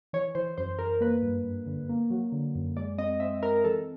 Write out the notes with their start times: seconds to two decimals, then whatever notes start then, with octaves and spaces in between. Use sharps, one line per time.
0.13 E3 C#5
0.35 E3 C5
0.58 F#2 C5
0.79 F#2 A#4
1.01 A#3 B4
1.22 G2
1.44 G2
1.66 D3
1.89 A#3
2.10 F#3
2.32 D3
2.55 F#2
2.77 G#3 D5
2.98 C4 D#5
3.20 C4 E5
3.43 C4 A#4
3.64 E3 A4